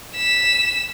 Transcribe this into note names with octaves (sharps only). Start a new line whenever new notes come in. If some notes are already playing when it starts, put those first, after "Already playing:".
B6 E7